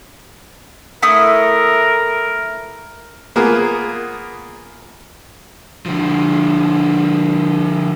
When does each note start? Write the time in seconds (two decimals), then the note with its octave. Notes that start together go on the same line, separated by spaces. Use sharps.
1.02 A3 E4 A#4 D#6
3.36 A#3 B3 F4 G#4 A#4
5.86 D3 F3